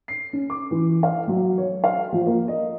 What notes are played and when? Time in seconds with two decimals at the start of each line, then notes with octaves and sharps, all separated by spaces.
0.08 C7
0.33 C#4
0.50 D6
0.71 E3
1.03 F5
1.28 F#3
1.58 C#5
1.84 F5
2.12 F3
2.27 A#3
2.48 D#5